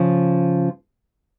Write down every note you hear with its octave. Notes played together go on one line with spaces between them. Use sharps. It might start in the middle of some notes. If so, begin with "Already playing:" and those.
Already playing: C#3 F3